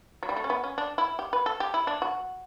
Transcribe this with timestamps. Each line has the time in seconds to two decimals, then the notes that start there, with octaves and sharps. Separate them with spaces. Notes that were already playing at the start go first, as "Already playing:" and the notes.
0.23 F#3
0.29 G3
0.36 A3
0.44 C#4
0.50 B3
0.64 C#4
0.78 D4
0.98 E4
1.19 G4
1.33 B4
1.46 A4
1.60 G4
1.74 E4
1.87 D4
2.02 F#4